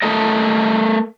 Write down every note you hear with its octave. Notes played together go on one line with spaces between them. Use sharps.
A3 A4 A#4 D#5